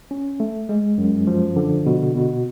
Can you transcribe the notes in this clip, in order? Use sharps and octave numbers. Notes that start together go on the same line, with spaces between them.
C#4
A3
G#3
F#2
F3
D3
B2
B2